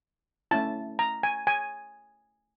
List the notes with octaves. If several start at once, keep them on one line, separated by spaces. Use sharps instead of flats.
A3 C#4 E4 A5
A#5
G#5
G#5